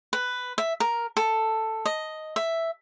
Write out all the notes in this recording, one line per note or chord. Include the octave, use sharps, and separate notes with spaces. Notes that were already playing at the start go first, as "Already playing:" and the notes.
B4
E5
A#4
A4
D#5
E5